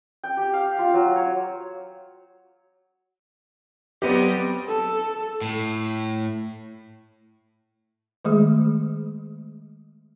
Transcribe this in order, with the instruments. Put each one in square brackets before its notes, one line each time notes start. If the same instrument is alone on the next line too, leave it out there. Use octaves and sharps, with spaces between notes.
[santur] G5
G4
F5
F4
F#3
C#5
[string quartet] F#3 G3 D#5 [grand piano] B3 C4 G4
[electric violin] A4
[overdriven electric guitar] A2
[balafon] D#3 G#3 A3 G#4